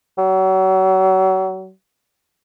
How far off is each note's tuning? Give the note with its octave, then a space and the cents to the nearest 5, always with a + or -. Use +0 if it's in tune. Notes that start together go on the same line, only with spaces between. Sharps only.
F#3 +35